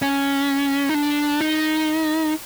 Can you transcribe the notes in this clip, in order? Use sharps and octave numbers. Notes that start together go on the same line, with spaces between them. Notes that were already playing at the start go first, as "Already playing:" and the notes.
C#4
D#4
D4
D#4